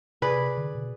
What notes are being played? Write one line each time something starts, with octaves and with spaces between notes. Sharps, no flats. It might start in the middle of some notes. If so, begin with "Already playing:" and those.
C3 G#4 B4 D5
D3
B2